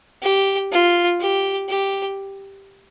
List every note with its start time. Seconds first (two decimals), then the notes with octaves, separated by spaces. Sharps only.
0.23 G4
0.72 F4
1.20 G4
1.69 G4